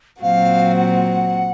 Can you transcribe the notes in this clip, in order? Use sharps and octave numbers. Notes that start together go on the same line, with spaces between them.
A#2 F#3 C4 F#4 F5
F#5